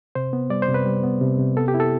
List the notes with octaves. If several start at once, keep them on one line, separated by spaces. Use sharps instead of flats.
C3 C5
B3
G3 D5
C5
C3
B4
G3
B3
C3
C3
B3 A4
G4
E4
A4